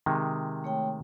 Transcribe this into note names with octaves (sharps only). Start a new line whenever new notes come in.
C3 D#3 G#3
A3 C#5 G5